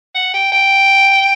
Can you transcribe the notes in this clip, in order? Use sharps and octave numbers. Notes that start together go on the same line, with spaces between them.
F#5
G5
G5